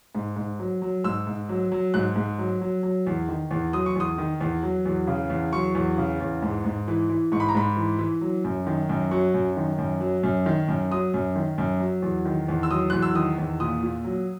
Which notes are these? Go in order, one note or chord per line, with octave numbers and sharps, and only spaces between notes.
G#2
G#2
F#3
F#3
G#2 E6
G#2
F#3
F#3
G#2 F#6
G#2
F#3
F#3
F#3
E2
D#3
E2
F#3 D#6
C#6
E2 D#6
D#3
E2
F#3
E2
C#3
E2
F#3 C#6
E2
C#3
E2
G#2
G#2
E3
E3
G#2 C#6
B5
A#5
G#2 B5
E3
E3
F#3
F#2
D#3
F#2
F#3 C#6
F#2
D#3
F#2
F#3
F#2
D#3
F#2
F#3 D#6
F#2
D#3
F#2
F#3
E2
D#3
E2
E6
F#3 D#6
E2 F#6
E6
D#3 D#6
E2
A#2 D#6
A#2
F#3